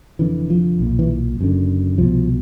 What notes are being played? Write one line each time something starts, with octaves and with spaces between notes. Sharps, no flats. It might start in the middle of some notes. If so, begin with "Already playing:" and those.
F1 F2 D3 E3
F3
B1 A#2
E3
F#1 F#2 D3
C2 B2 F3